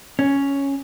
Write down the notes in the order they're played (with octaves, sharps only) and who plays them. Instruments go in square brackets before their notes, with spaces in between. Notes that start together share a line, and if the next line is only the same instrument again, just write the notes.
[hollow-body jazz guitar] C#4